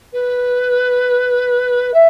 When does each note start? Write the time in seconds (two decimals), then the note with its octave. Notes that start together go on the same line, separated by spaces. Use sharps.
0.13 B4
1.94 E5